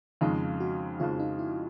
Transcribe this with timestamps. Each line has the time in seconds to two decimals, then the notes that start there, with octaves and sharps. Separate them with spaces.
0.21 F2 C#3 F3 G#3 D#4
0.60 F#4
1.00 F2 C#3 F3 G#3 F4
1.19 D#4
1.39 E4